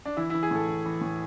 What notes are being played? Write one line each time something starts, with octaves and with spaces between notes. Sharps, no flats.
D4
E3 E4
E4
E3
G#4
A2 A4
E3
E3
A2